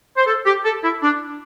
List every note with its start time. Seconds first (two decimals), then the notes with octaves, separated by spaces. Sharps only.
0.17 C5
0.26 A4
0.46 G4
0.64 A4
0.83 E4
1.03 D4